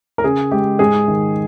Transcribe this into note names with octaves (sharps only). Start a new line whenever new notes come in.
A#4
C#3 G#4
G#3 G4
G#2 G#4
D#3